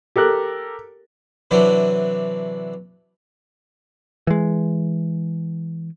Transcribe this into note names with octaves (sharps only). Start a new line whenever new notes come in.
G4 A4 A#4 F#6
C3 E3 F#3 D4
E3 G#3